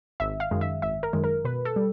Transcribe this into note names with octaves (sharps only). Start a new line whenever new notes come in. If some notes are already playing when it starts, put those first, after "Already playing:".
G#1 E5
F5
F#2 D#3 G#3
E5
G#1 E5
A#4
F#2 D#3 G#3
A#4
B2 B4
A4
G3